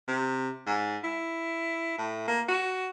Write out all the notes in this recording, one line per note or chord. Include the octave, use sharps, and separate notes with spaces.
C3
G#2
E4
A2
A#3
F#4